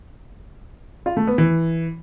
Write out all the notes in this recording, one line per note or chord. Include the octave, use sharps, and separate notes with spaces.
F4
A3
B3
E3